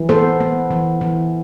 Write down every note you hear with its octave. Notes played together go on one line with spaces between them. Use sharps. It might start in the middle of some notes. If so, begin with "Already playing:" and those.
Already playing: E3
B3 A4 C5
B3
E3
E3